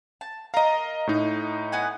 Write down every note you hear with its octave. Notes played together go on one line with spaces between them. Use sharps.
A5
A#4 D#5 F5 A#5
A2 D#4
B3 F#5 G#5